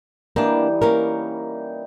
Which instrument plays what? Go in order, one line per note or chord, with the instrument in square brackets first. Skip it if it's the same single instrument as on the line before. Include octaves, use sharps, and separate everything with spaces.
[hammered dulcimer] E3 G3 D#4 [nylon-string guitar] A#3 D4
[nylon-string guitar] A#3 C#4 A#4